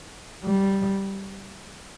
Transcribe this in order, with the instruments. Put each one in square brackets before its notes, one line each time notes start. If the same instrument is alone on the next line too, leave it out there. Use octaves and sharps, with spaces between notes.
[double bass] G3